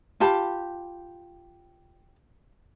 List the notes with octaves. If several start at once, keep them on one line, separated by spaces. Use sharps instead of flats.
F4 G4 A5 B5